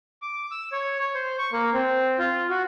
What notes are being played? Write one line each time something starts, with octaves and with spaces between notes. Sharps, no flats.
D6
E6
C#5
C#5
C5
C#6
A#3
C4
F4
F#4